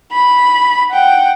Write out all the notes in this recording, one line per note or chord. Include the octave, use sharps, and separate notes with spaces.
B5
F#5 G5